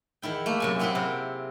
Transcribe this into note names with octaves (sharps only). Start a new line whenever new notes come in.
E2 D#3 E4 G5
A3 A#3
F#2 C3 G#5
B3 C4 E4 G#4 B4
C3 A#4